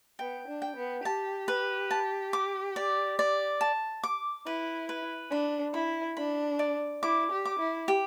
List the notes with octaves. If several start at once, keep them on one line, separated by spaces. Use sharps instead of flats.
B3 G5
D4
G5
B3
G4 A5
B4
A5
D6
D5
D5
A5
D6
E4 B4
B4
D4 B5
E4 B5
D4 B5
D5
E4 D6
G4
D6
E4
G4